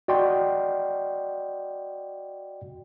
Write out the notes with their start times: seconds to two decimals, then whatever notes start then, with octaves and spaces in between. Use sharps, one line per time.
0.08 F#4 D5 D#5 G5 C6